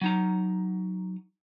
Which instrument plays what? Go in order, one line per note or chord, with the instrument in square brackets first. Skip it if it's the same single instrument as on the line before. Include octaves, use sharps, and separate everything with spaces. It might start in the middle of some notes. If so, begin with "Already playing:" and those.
[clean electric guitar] F#3 D#4 A#5